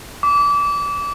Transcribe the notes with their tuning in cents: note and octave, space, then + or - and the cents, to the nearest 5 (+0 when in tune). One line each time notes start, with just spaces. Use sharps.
D6 -30